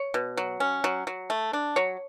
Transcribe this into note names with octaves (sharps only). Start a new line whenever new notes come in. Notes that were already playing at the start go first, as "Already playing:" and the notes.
Already playing: C#5
B2
F#3
C#4
F#3
F#3
A3
D4
F#3 C#5